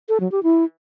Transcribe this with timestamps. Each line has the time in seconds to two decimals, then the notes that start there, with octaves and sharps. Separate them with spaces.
0.09 A4
0.20 F#3
0.32 G4
0.43 E4